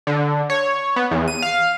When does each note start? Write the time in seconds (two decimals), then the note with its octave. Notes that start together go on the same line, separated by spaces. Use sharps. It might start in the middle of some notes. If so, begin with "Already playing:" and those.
0.07 D3
0.50 C#5
0.96 B3
1.11 E2
1.28 D#7
1.42 F5